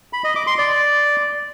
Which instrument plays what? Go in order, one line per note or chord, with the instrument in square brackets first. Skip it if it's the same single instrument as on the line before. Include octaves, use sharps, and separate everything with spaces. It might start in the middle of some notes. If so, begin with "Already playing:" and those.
[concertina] B5
D#5
D6
C6
D5